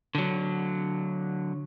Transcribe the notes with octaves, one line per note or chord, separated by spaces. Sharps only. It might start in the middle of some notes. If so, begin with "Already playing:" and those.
D3 F#3